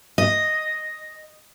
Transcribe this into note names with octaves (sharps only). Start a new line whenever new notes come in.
D#5